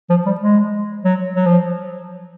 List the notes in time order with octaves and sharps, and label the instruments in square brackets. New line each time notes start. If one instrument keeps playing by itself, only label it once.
[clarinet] F3
G3
G#3
F#3
F#3
F3